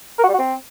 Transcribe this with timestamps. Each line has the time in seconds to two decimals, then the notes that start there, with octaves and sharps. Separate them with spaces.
0.19 A#4
0.24 F#4
0.29 G3
0.34 F#4
0.39 C4